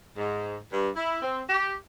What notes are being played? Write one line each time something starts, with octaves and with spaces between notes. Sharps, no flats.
G#2
G2
E4
C4
G4